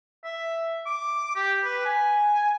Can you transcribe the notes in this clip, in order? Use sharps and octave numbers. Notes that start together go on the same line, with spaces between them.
E5
D6
G4
B4
G#5